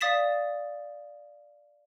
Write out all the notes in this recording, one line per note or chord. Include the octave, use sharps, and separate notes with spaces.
D5 F5 D#6 A6 B6 E7